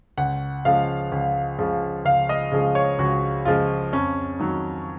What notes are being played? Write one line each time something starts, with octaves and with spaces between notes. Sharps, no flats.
C#2 F#5
C#3 F3 G#3 F5
C#2
C#3 F3 G#3
C#2 F5
D#5
C#3 F3 G#3
C#5
C#2 F#4
C#3 F3 G#3 F4
F2 C#4
D#3 F#3